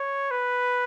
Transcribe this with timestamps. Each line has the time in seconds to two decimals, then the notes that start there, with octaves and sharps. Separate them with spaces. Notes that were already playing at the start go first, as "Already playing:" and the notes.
Already playing: C#5
0.31 B4